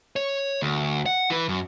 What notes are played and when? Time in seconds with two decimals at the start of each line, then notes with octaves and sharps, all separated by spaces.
0.16 C#5
0.62 D2
1.06 F#5
1.30 E3 B4
1.49 F#2